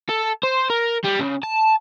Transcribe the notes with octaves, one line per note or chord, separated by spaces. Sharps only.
A4
C5
A#4
G3
C#3
A5